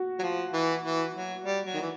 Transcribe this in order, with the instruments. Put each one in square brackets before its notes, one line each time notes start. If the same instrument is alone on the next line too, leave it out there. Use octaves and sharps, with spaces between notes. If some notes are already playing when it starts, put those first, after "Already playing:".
Already playing: [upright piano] F#4
[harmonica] F#3
F3
E3
E3
F#3
G3
F#3
D#3
E3